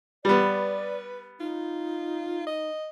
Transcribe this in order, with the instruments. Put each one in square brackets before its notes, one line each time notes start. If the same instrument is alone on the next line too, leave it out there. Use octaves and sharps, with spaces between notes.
[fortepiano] G3 B3 [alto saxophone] B4 [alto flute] D5
[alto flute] D#4 [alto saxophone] F4
[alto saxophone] D#5